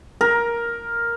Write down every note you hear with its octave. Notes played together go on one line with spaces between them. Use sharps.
A#4